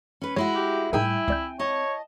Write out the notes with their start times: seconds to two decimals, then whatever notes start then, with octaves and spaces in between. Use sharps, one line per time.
0.22 C#4 B4
0.36 G#3 E4 F#4 C#5
0.55 G4
0.93 A2 G3 D#4 E4 G#4 A#4 G5 G#5
1.28 C#2 C4 D5 G6
1.59 C#5 D#5 A5